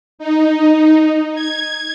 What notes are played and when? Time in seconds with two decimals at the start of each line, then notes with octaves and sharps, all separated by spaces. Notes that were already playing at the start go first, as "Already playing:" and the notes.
0.19 D#4
1.35 G#6